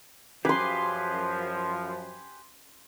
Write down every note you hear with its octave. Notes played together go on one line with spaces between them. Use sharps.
F#2 F3 G4 G#4 B4 C6 D6